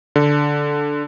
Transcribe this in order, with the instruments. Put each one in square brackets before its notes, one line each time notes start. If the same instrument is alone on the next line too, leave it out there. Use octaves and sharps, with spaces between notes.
[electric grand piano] D3